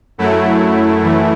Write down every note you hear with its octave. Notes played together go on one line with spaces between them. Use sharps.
F#2 F#3 A3 E4
F#2 E3 A3